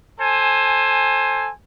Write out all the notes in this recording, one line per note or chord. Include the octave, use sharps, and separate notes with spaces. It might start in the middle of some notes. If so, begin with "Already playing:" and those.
A4 C5 G#5